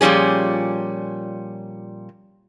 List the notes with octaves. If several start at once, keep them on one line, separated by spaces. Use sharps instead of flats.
A#2 F3 G3 C#4 G#4